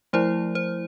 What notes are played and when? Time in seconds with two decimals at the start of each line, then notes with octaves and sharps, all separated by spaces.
0.13 F3 A3 E4 C5
0.55 C5